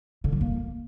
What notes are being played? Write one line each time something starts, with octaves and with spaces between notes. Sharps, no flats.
D3
F#3
A#3